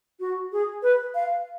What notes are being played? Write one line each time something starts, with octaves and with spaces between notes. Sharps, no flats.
F#4
G#4
B4
F5